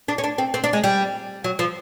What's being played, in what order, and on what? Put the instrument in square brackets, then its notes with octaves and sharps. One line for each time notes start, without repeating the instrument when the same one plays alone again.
[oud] D4
C#4
D4
C4
C4
D4
G#3
G3
F#3
F3